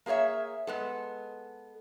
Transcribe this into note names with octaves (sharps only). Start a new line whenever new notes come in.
A#3 G#4 A4 C#5 E5
G#3 B3 A4